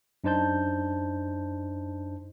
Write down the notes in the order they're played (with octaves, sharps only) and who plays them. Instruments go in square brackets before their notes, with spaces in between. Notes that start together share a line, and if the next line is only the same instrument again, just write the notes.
[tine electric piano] F#2 D4 D#4 C5 A5 G6